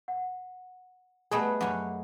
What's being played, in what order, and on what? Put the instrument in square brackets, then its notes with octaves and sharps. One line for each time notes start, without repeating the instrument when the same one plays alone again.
[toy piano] F#5
[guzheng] G3 A3 B3 [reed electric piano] G#4 D#5
[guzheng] F#2 C#4 [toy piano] F#5 D6